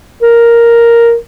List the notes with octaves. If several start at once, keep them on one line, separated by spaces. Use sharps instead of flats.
A#4